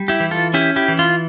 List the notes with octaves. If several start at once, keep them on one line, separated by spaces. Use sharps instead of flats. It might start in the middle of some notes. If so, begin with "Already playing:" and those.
Already playing: G3
E4 G4
E3
F4 A4
C#4 E4 G4
E4 G4
E3
F4